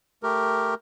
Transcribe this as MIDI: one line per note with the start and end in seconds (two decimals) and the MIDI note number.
0.23 0.74 57
0.23 0.74 67
0.23 0.74 70